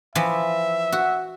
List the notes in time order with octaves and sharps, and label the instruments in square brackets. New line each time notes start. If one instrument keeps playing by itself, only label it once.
[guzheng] E3 F3 [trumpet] E5
[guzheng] F#4